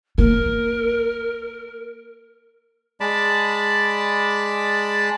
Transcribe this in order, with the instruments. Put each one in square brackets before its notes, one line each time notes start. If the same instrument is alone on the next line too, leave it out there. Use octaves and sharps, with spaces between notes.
[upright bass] A#3 [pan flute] A#4
[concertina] G#3 D5 A5 B5